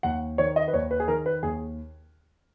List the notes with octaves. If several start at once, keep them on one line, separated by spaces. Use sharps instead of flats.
D#2 F#5
D#3 C#5
D#5
B4
D#2 C#5
B4
G#4
D#3 A#4
B4
D#2 G#4